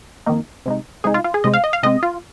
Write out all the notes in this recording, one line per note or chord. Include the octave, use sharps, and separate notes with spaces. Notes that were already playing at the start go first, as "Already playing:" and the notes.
F2 D#3 A#3 D#4
C3 G#3 D#4
C3 G#3 D#4 G#4
F4
F4
G#4
C3 G#3 C4 D#5
F5
D#5
F5
C3 G#3 C4 D#5
F4